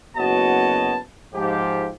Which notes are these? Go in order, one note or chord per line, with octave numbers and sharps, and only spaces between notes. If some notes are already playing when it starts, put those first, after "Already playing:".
F#1 B3 F#4 C#5 D#5 A5
G#2 F3 G4